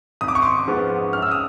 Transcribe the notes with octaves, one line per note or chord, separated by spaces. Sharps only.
G#1 D#6
D6
C#6
C6 D6
G#2 F3 G#3 B3
F#2 F6
E6
D#6